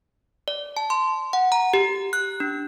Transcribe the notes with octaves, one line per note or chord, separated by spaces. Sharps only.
D5
A5
C6
F#5
A#5
G4
F#6
D4